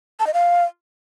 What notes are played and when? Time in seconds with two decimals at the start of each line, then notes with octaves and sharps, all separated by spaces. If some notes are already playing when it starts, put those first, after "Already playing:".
0.20 A5
0.27 D#5
0.34 F5